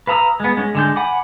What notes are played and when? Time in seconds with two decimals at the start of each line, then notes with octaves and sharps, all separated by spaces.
0.07 B4 F5 A#5 D#6 E6
0.40 G#3 B3
0.57 G#3 C#4
0.75 D3 G#3 G6
0.96 F#5 G#5 B5 D6